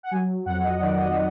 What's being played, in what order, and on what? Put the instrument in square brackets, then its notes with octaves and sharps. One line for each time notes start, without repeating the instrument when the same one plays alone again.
[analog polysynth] F#5
F#3 G#5
F2 F#5
D#5
D#3 D5
D#5